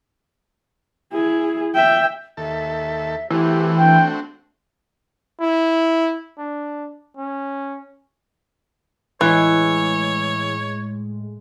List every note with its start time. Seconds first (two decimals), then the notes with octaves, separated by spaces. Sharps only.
1.13 E4 G#4
1.74 E5 G5
2.37 D#2 A4 E5
3.30 E3 A3 C4 F#4 G4
3.78 D4 G5
5.41 E4
6.38 D4
7.17 C#4
9.21 A2 E3 G#3 C#5